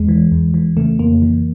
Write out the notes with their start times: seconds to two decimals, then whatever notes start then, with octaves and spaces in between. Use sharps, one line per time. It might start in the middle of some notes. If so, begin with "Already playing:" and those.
Already playing: E2 G#3
0.09 E3
0.32 E2
0.54 E3
0.77 C#3 A3
0.99 F2 A#3
1.22 E3